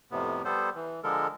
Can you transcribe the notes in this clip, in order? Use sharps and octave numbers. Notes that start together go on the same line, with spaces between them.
F2 A2 C3 B3
G3 B3 A4 C5
E3
D3 F3 G#3 A4 A#4